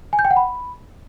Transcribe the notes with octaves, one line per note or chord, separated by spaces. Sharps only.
G#5
G6
G5
F#5
B5